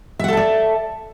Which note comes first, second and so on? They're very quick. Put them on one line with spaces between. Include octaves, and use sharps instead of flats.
E5 F#5 A4 A5 D5